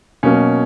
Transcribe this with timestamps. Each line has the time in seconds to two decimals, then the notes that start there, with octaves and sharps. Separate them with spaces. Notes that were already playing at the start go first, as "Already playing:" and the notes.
0.23 B2 F#3 A#3 C#4